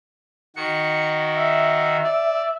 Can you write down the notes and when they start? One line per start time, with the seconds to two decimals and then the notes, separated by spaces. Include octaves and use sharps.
0.56 D#3 F#4 C#7
1.36 E5
2.04 D5